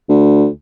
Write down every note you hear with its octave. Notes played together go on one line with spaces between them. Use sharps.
D2